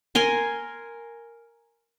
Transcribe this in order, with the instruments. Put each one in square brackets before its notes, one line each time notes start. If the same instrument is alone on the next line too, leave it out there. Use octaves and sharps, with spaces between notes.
[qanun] A#4 G#5 C6